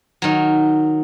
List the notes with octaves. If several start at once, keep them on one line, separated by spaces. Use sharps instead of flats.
D#3 F#3